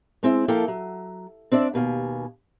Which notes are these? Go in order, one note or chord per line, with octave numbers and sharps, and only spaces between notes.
G#3 C4 E4
F3 A#3 E4 A4 F5 G5
F#3
C4 D4 D5 E5
D#2 B2 F5 G#5